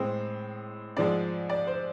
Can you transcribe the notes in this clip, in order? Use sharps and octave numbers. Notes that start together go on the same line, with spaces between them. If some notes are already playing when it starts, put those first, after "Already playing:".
Already playing: A2 G#3 C4
G#2 F3 G#3 C4 D5
D5
C5